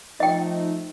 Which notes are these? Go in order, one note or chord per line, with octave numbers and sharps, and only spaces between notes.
F3 A3 D#4 D#5 G5